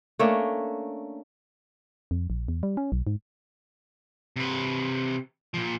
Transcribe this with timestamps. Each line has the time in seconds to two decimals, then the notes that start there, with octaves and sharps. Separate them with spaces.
0.19 A3 A#3 C#4 D4
2.11 F2
2.30 A#1
2.48 E2
2.63 G3
2.77 C#4
2.92 B1
3.07 G#2
4.36 C3 B4
5.54 A#2 F3